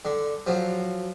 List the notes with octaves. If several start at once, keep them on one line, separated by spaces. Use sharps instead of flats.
D3
F3 F#3